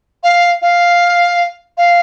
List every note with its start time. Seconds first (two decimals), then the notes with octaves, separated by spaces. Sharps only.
0.24 F5
0.62 F5
1.78 F5